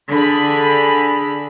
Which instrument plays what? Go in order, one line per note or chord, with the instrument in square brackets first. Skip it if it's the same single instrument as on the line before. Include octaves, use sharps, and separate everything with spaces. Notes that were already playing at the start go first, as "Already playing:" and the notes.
[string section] D3 B5 [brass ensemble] G#4